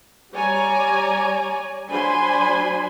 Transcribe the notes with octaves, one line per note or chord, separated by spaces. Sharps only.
G3 C#5 D5 G#5 A#5
F#3 D4 C5 G#5 B5 C6